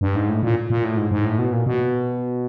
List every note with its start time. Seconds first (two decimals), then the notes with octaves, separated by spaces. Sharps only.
0.01 G2
0.15 G#2
0.29 A2
0.43 A#2
0.70 A#2
0.84 A2
0.97 G#2
1.11 G#2
1.25 A2
1.39 B2
1.53 A#2
1.66 B2